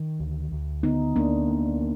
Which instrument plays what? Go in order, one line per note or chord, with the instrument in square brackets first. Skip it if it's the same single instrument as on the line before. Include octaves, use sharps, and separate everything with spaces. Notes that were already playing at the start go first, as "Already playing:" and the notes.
Already playing: [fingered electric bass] D#3
D2
D2
[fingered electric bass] D3 [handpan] B3 D#4
[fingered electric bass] D2 [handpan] A#3 D4
[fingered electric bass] A#3
A#3